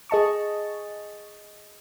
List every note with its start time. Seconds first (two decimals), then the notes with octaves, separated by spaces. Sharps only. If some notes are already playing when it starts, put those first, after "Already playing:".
0.09 G#4 D#5 A5 C#6